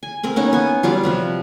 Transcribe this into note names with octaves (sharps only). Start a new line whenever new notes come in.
G#5
C4 A#4 B5
A#3 B3 C#4 D#4
B3 G#5
F#3 G3 F4 D5
C3 F3 B4